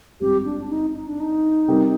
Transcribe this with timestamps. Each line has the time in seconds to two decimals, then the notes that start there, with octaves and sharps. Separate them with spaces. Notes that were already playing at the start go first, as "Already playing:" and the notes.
0.20 G#1 G2 F3 C4 G4
0.45 D4
0.69 D#4
0.94 D#4
1.07 D4
1.20 D#4
1.68 C3 G3 C4 G4 A#4